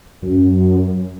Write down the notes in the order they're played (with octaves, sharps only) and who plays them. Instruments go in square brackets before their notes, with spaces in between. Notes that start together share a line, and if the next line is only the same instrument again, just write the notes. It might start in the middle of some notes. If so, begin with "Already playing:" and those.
[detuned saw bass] F#2